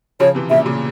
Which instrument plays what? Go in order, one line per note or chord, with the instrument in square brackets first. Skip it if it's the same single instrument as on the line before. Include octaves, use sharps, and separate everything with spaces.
[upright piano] C#3 F3 [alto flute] C#5
[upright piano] C3 E3
[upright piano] A#2 C#3 [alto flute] E5
[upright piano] A#2 C#3